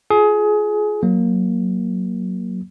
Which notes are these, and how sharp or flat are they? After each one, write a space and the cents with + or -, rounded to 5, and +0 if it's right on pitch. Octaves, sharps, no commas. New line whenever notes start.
F4 +0 G#4 +25
F#3 +0 A#3 +5